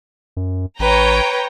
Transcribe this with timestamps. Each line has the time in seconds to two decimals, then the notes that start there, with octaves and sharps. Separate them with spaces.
0.37 F#2
0.79 A1 B4 C#5 G5 A#5